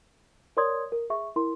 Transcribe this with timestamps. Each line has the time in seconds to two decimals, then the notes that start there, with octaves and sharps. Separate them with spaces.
0.57 A#4 C#5 D5 C6 D#6 G#6
0.92 A#4
1.10 G#4 E5 C#6
1.36 E4 A#4 C6